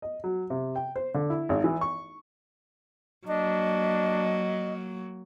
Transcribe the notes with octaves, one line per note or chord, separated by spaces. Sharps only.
D#5
F#3
C3
G5
C5
D3
E4
G#1
E3
C#6
F#3 A#3 D4 D#5